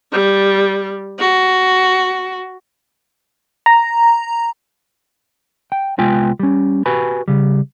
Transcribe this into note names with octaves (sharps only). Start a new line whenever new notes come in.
G3
F#4
A#5
G5
C2 G#3 B3 F4 G5 G#5
G3 C#4
F#4 G4 B4 G#5 A5 B5
C#3 G3